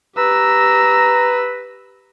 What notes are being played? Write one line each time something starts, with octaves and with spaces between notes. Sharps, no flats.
G4 B4 A#5 E6